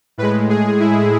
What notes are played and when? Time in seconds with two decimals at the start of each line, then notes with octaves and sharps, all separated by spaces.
0.18 A2 G#3 B4
0.49 G#4
0.80 E4